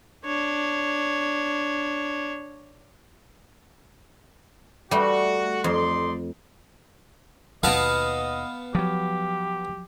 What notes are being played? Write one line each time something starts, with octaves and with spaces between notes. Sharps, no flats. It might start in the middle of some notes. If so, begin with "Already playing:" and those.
D4 C#5
G3 A3 F#4
F2 D#4 D5 C6
D#2 B2 B3 D#5 F5 A5
F3 F#3 G4